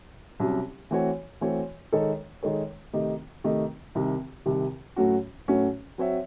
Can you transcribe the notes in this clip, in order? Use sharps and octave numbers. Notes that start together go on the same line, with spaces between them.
C2 C3 F#3 C#4
E3 A3 C4 F#4 C#5
E3 A3 C4 F#4 C#5
D#3 G#3 D#4 A4 C#5
D#3 G#3 D#4 A4 C#5
C3 D#3 A3 D#4
C3 D#3 A3 D#4
C2 C3 D#3
C2 C3 D#3
A2 F#3 A3 C#4 F#4
A2 F#3 A3 C#4 F#4
F#3 C4 F#4 C#5 E5